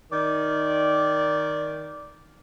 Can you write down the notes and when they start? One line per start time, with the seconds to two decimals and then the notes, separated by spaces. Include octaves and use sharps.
0.11 D#3 D5